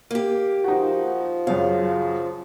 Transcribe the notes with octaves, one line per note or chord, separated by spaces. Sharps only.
A#3 G4
F3 D#4 F#4
F#2 C#3 F5